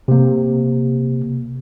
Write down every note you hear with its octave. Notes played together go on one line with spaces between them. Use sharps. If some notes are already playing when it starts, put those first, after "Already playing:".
C3 A#3